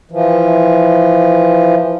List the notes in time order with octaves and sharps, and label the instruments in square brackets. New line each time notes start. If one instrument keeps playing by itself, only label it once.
[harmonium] E3 F3